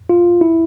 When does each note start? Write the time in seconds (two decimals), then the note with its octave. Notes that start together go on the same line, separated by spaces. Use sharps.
0.10 F4
0.41 E4